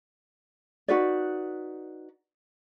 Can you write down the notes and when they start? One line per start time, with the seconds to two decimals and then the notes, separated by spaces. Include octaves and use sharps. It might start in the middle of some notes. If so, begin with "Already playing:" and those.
0.88 D#4 F#4 B4 D5